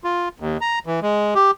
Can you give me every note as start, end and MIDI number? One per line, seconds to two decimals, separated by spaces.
0.04 0.29 65
0.40 0.57 39
0.61 0.79 82
0.86 1.00 52
1.02 1.34 56
1.35 1.51 67